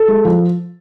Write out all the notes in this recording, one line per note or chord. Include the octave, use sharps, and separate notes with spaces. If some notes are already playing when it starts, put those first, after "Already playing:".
Already playing: A4
G#3
F3